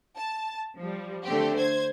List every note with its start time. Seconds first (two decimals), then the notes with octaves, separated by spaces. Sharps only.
0.17 A5
0.78 F3 G3
1.25 D3 A3 C4 G4
1.56 C5 G#6